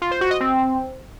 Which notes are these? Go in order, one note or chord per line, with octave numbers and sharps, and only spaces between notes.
F4
C5
F#4
D#5
C4